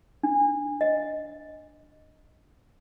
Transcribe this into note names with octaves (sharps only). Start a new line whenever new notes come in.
D4
D#5